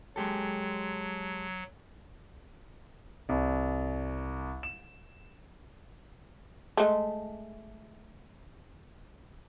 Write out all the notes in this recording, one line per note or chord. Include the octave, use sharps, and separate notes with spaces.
F#3 G#3 G4 A4
C2
E7
G#3 A3